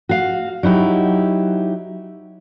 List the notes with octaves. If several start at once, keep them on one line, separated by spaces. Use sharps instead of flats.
F#4 F5
F#3 D#4 E4 G4